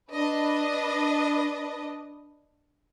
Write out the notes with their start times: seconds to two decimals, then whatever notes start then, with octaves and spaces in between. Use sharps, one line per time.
0.12 D4 B4 D#5